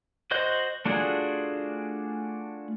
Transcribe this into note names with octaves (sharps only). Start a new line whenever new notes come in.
F#4 C5 D#5 G6
A3 D4 F4 F#4 G#4